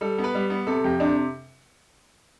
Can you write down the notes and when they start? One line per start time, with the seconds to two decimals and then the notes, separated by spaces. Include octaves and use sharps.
0.01 G3 A4
0.18 B3
0.24 B4
0.35 G3
0.50 B3
0.67 C3 A4
0.84 F2 G4
1.00 C3 D4